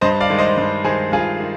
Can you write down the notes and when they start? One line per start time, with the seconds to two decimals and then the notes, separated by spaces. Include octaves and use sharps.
0.01 G2 C5 D#5
0.20 D5 F5
0.30 D#3 G#3
0.38 C5 D#5
0.57 G2
0.84 D#3 G#3 G#4 C5
1.12 G2 F4 G#4
1.40 D#3